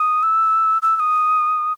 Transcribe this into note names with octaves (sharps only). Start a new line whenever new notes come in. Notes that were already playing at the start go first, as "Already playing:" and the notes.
Already playing: D#6
E6
E6
E6
D#6